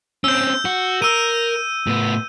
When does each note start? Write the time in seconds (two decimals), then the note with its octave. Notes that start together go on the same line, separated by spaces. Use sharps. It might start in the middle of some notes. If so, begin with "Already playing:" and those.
0.24 C4 C#4 E6 G6
0.65 F#4
1.02 A#4 E6 D#7
1.87 A2 B3